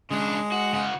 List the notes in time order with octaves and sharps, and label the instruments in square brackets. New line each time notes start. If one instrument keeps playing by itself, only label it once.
[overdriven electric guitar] C#3 D4 [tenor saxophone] G#3
[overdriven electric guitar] F#4
C#3 F#4